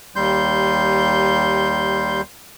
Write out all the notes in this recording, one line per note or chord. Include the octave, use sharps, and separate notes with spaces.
D#2 G3 C6 G6